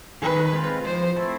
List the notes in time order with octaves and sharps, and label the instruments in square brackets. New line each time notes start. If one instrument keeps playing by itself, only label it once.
[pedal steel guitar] D#3 [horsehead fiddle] B4
[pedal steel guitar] G#3 C4 F4
[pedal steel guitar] F3 [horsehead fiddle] C5
[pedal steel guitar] A3 C4 E4 A4